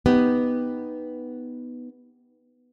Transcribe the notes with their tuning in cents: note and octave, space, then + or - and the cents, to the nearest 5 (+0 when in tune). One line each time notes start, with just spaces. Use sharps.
B3 +0 D#4 +0 G4 +0